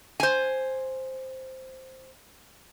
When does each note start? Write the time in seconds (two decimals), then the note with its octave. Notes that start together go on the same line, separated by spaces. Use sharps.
0.20 C5 G#5